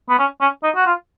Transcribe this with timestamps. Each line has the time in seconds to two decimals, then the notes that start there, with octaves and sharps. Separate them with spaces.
0.09 B3
0.19 C#4
0.41 C#4
0.63 D#4
0.75 F#4
0.86 F4